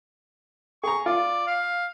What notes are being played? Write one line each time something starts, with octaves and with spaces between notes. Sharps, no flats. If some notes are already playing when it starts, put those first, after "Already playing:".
G#4 A#5 C#6
F4 D5
F5